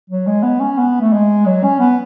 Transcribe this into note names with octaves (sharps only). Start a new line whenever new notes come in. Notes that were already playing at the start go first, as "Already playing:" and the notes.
F#3
G#3
B3
C#4
B3
A3
G#3
F#3
C#4
B3